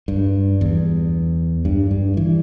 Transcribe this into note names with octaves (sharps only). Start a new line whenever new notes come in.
G2
E2
G2
G2
E3